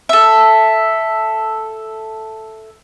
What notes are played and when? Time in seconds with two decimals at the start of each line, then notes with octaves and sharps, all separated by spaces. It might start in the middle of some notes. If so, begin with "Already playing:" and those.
0.09 A4 E5